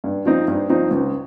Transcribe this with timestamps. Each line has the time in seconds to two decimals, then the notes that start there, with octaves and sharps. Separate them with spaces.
0.04 G2
0.26 F3 C4 D#4
0.48 G2
0.69 F3 C4 D#4
0.91 C#2